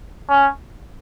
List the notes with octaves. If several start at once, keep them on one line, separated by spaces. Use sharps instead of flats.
C#4